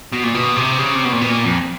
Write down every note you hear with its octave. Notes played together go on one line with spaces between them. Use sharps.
B2
A#2
B2
C3
C#3
C3
B2
A#2
B2
A#2
F2